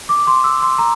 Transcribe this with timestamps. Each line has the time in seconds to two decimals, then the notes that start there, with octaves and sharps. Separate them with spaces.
0.09 D6
0.27 C6
0.44 E6
0.62 C6
0.78 A#5